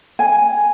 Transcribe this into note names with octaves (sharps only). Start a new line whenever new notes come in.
G#5